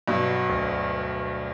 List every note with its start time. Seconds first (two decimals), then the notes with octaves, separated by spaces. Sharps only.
0.08 G2 B2 F#3
0.49 D2